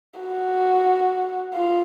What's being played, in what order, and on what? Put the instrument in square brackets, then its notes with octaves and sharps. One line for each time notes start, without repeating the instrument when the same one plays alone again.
[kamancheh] F#4
F4